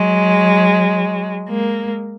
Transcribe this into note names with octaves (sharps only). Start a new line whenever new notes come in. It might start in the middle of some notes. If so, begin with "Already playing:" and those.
Already playing: F#3 G#3
G#3 A#3